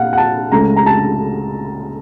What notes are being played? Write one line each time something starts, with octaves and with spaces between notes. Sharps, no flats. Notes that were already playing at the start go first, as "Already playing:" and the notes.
Already playing: A#2 F5 F#5
F#5
A5
C#2 C#3 A3 A#5
A#5
A5